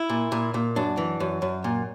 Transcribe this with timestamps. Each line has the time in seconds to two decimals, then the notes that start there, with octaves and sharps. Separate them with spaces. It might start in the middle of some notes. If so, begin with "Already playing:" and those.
Already playing: E4
0.10 A#2
0.32 A#2
0.54 A#2
0.76 F#2 D4
0.97 E3
1.20 F#2
1.42 F#2
1.64 A#2